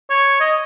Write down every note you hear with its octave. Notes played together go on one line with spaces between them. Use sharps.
C#5
D#5